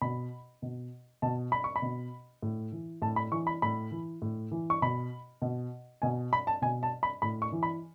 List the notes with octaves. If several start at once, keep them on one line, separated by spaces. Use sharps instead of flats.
B2 B5
B2
B2 A5
B5
C#6
B5
B2
A2
E3
A2 A5
B5
E3 C#6
B5
A2 B5
E3
A2
E3
C#6
B2 B5
B2
B2 G#5
B5
A5
B2 G#5
A5
B5
A2 B5
C#6
E3
B5